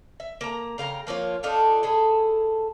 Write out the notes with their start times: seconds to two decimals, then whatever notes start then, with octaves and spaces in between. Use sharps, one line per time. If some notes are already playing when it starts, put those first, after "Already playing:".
0.20 E5
0.41 A#3 A#5
0.78 C#3 F5 G5 A#5
1.07 F3 A#3 F4 C#5
1.43 D4 D#4 F4 A4
1.83 E4 G#4 A4